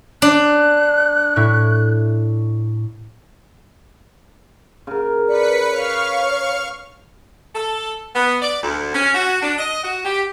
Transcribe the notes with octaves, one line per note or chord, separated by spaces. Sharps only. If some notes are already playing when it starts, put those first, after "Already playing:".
D4 F#6
A2 E4 C#6
C#3 A#4
B4 D5 B6 C#7
C#5 F5 C#6 F6
A4
B3
D5
D2
C#4
F#4
D4
D#5
F#4
G4